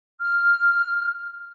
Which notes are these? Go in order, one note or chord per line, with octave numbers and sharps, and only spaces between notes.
F6